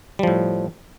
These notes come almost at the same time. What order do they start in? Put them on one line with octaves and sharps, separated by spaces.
G3 F3 A2